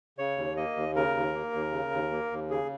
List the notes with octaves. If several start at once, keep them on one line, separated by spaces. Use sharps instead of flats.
C#3 C#5
D#2
A#3 D#5
D#2
C#3 A#4
D#2
A#3
D#2
C#3
D#2
A#3
D#2
C#3 G#4